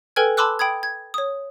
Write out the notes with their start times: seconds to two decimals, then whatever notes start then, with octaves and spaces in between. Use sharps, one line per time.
0.16 A4 B4 G5 G#5 F6 G#6
0.37 A5 B5 C6 D6 E6 F#6
0.59 G5 B5 D#6 G#6
0.83 G#6
1.14 C#5 D#6